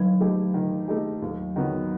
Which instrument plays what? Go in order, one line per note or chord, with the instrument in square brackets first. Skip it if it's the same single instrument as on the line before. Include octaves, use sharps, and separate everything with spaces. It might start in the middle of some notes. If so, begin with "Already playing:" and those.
Already playing: [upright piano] D#3 [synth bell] F#3
[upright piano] A3 D#4 G4
D#3
A3 D#4 G4
D#2
D#3 F#3 B3